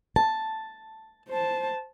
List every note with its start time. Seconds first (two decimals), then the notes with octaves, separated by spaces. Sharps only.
0.16 A5
1.29 C5 A5